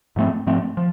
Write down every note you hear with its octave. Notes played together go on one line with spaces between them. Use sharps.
G#2 F3 A3 C4
G#2 F3 A3 C4
F3